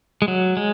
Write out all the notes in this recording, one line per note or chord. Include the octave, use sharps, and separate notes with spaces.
G#3
F#3
G#3